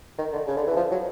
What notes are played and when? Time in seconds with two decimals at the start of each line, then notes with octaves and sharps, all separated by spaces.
0.18 D#3
0.33 D3
0.47 C#3
0.57 D3
0.67 E3
0.76 F3
0.91 F#3